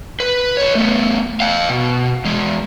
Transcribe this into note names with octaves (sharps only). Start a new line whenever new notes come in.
B4
B4 C#5
A3 B3
F5 G5
B2
E2 G#3